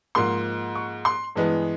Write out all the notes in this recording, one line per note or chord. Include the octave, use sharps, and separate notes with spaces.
G#2 F3 A#3 C6
C#6
C6
G2 E3 G#3 B3